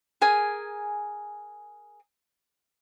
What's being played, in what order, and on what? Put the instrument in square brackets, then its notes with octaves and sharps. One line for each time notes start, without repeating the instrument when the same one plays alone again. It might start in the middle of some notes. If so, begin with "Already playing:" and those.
[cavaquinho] G#4 A#4 G#5